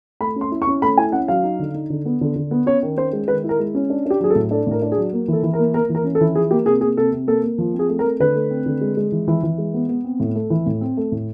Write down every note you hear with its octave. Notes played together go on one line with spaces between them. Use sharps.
A3 B5
C#4
C6
E4
C#6
C#4
A3 B5
E4 G#5
C#4 F#5
F#3 F5
D#4
D3
D#4
D3
B3
D3
D3
B3
C#4 C#5
D#3
C#4 C5
G#3
D#3 B4
E4
A#4
G#3
C#4
D4
D4 G4
F#3 G#4
A4
A2
D4 A4
A2 A#4
D4
G#4
F#3
A#3
E3 A4
E3
A#4
A#3
A#3 A#4
E3
A#4
C#4
A4
E3
F3 G#4
A#3 G4
C3 G#4
A#3 G#4
C3 A4
C3
A#3 A4
A#3
F3
C4
G#4
A3
A#4
A3
D3 B4
A3
C4
D3
G#3
G#3
E3
E3
E3
G#3
B3
B3
C4
A2
A3
E3
A2
C4
A3
A2